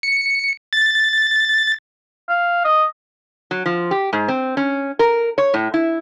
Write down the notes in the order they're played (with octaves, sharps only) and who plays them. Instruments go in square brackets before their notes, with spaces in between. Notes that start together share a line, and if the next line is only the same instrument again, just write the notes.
[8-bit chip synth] C#7
A6
[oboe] F5
D#5
[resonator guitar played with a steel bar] F#3
F3
G4
G#2
C4
C#4
A#4
C#5
A2
E4